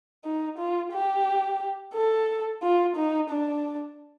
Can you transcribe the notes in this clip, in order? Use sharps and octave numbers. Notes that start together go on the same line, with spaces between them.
D#4
F4
G4
A4
F4
D#4
D4